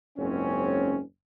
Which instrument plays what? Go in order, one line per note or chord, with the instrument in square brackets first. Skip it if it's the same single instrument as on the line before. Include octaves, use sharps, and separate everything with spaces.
[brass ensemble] F#1 C#2 G#2 C4 C#4